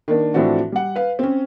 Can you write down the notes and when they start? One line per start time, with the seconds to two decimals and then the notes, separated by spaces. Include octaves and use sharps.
0.08 D#3 A#3 D4
0.34 A2 E3 F3 C4 D4 F#4
0.72 G3 F#5
0.96 B4 F5
1.19 C4 C#4